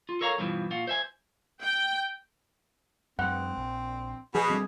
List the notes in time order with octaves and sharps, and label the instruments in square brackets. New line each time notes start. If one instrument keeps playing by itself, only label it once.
[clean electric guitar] F4
A4 A#4 C#5 F5 A#5
G2 B2 E3 F3
A#2 F4 F#4
C5 E5 G#5
[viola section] G5
[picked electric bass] F#2 G#3 [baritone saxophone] C4 [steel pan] F#5
[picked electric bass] A#1
[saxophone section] B2 [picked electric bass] F3 [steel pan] G#4
[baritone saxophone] D3 [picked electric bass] G3 C4